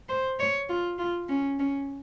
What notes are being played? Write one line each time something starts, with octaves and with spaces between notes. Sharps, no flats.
C5
C#5
F4
F4
C#4
C#4